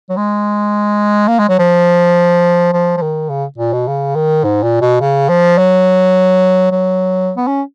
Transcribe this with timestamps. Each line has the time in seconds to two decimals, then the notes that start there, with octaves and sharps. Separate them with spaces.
0.10 F#3
0.17 G#3
1.28 A#3
1.39 G#3
1.49 F#3
1.59 F3
2.74 F3
2.97 F3
3.02 D#3
3.30 C#3
3.58 A#2
3.73 B2
3.88 C#3
4.16 D#3
4.44 G#2
4.63 A#2
4.81 B2
5.01 C#3
5.29 F3
5.58 F#3
6.72 F#3
7.37 B3
7.48 C#4